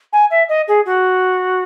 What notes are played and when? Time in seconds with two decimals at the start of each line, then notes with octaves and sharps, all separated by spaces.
0.13 G#5
0.30 E5
0.49 D#5
0.68 G#4
0.86 F#4